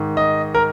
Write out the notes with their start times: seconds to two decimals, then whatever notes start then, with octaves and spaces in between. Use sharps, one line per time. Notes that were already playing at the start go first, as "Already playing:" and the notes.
Already playing: G#2 D#3
0.17 D#5
0.54 A#4